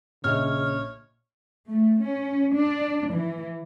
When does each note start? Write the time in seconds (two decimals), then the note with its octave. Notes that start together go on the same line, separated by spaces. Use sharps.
0.24 A#1 C#3 C#5 D#5 E5 F6
1.68 A3
2.04 C#4
2.52 D4
3.11 E3